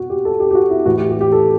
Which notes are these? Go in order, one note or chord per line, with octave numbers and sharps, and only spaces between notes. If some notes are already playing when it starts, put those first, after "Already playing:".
Already playing: B2 F#4
G4
A4
G4
G4
F#4
E4
A2 E3 F#4
G4
G4
G4
A4